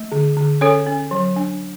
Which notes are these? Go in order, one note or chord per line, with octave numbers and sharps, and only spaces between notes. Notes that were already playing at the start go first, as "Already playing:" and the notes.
Already playing: A3
D3
D3
C#4 A4 C#5
C#4
F#3
D4